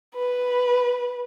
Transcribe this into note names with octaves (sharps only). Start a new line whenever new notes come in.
B4